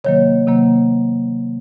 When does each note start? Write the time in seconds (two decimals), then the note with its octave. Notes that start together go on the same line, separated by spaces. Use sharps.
0.04 C3 D#3 F#3 A#3 C#5
0.47 C3 D#3 F#3 A#3